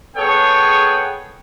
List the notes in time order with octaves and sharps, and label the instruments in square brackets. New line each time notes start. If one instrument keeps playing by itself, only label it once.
[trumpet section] B3 G#4 A4 C#5 G5